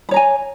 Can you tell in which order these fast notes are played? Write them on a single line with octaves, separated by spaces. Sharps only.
B5 C#5 A#5 G#5